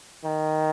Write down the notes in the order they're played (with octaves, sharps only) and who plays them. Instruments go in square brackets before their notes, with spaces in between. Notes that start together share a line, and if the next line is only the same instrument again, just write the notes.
[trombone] D#3